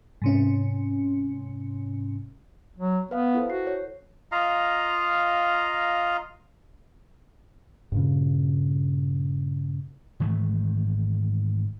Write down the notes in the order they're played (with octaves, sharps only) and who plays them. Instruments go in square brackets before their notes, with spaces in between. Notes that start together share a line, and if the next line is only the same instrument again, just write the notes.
[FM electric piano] G#2 C3 C#4
[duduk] F#3
[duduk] B3 [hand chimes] B4 F5 F#5
[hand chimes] E4 A4 C5
[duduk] F#4 [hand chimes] C7
[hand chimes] C#5
[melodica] F4 D#5 F5 A#5
[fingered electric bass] G2 A#2 C#3
[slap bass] G#2 D#3 E3 A3